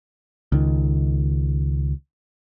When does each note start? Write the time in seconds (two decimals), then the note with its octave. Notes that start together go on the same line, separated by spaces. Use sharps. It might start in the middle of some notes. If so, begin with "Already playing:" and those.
0.52 C#2 D#3